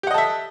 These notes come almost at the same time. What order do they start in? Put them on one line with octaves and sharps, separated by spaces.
G4 F#5 D#5 A4 E5